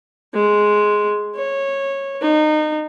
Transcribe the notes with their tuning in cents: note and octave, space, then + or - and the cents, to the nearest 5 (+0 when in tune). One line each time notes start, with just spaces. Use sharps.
G#3 +5
C#5 -15
D#4 -25